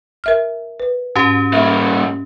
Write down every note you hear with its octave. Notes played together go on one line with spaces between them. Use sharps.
A#4 E5 F6
B4
G#2 C#4 G4
G3 A#3 E5